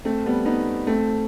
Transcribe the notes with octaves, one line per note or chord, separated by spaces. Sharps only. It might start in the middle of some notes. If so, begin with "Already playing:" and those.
A3 C4
G3 B3
B3 D#4
A3 C4